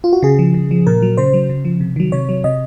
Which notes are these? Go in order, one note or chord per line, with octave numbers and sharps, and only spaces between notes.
F4
F#4
C#3 G#4
F3
C#3
F3
A#2 A#4
F#3
C#3 C5
F#3
C#3
F3
C3
D#3 F#3
C3 C#5
F#3
C3 D#5